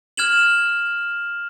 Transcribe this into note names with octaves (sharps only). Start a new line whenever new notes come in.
F6 G#6 E7 F#7